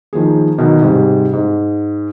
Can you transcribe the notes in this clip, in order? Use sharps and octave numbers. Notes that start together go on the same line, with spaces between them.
D#3 F3 A#3 G#4
B2 D#3 F#3
G#2 C3 G3
G#2